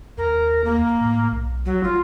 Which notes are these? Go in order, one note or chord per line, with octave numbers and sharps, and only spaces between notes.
D#2 A#4
A#3
A2
B1
F#3
G#1 F4